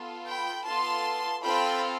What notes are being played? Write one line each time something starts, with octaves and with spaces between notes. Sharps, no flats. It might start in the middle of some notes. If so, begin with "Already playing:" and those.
Already playing: B3 F4 A4
G5 B5
B3 F4 A4 A5 C6
C4 F4 A4 G5 B5